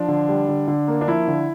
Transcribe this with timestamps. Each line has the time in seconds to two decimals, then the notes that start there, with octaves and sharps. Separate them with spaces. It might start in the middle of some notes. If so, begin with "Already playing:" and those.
Already playing: F3 D4
0.08 D3
0.29 G3
0.48 D3
0.68 D3
0.88 A#3
1.01 D4
1.08 F3 E4
1.28 D3